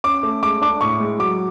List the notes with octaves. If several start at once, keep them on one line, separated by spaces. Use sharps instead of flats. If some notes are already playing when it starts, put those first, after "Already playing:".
C#4 D6
A3
G#3 D6
D4 D6
A2 C#6
G#3
F#3 D6